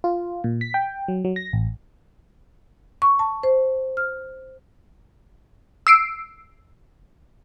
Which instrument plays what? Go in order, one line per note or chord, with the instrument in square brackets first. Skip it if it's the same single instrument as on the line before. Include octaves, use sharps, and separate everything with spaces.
[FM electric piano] F4
A#2
B6
G5
F#3
F#3
A#6
A1
[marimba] C#6
A5
C5
F6
[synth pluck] E6 C7 D7